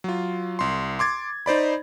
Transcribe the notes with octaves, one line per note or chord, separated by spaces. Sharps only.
F#3 F4
C2 C6
C6 D6 G#6 A6
D#4 C5 D5 B5